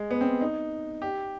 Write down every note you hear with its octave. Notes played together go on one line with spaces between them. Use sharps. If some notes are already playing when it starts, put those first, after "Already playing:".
Already playing: G#3
B3
C4
D#4
G4